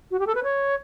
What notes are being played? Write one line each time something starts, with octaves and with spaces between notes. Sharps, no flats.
F#4
G4
A4
B4
C#5